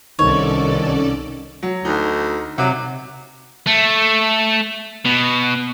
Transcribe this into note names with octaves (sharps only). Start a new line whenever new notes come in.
C2 D#3 C#4 A4 C#5 D5
F#3
D2 D#4
C3 F#3
A3
B2